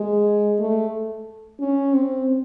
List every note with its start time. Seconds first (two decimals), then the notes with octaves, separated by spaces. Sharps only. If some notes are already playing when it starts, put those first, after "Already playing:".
Already playing: G#3
0.60 A3
1.60 C#4
1.94 C4